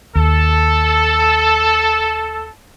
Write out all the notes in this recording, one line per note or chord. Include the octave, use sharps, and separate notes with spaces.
D#2 A4